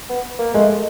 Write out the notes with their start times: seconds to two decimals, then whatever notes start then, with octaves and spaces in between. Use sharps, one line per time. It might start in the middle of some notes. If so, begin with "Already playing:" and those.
0.09 B3
0.39 A#3
0.54 G#3 A3